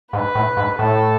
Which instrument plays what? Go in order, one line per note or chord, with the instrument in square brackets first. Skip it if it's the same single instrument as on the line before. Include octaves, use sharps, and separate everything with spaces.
[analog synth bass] G#2 [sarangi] B4
[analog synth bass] A2
G#2
[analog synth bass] A2 [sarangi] A4